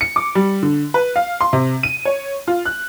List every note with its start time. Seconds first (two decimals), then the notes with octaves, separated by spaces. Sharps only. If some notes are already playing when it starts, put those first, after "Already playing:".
0.01 C#7
0.16 D6
0.35 G3
0.63 D3
0.94 B4
1.16 F5
1.41 C6
1.53 C3
1.83 D#7
2.05 C#5
2.48 F4
2.65 F#6